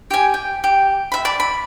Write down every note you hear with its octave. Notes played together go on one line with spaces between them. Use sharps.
G4 G#5
G5
G4
E5 B5
D5 A5 B5
B5